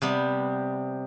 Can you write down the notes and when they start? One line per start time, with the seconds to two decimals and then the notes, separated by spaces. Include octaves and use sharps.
0.02 C3 G3 B3